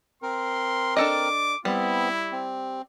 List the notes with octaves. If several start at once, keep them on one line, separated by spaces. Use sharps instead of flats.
C4 A#4 C6
D4 A4 D#5 D6
G3 B3 C4 E4
C4